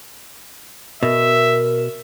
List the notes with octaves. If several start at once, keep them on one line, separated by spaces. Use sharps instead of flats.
B2 A#4 E5